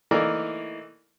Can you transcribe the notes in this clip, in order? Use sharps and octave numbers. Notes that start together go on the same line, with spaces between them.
E3 A3 A#3 D#4 A#4 D5